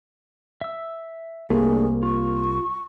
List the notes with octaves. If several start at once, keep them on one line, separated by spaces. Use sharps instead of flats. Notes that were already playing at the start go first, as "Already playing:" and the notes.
E5 E6
C2 A3 A#3 D4 G#4
F4 C#6